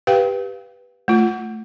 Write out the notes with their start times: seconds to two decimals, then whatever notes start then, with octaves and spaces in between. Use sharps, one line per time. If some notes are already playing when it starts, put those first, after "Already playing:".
0.07 G4 B4 F5 G5
1.08 A3 F4